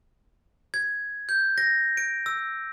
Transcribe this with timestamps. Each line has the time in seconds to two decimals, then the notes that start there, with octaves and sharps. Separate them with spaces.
0.74 G#6
1.29 G6
1.58 A#6
1.97 D7
2.26 E6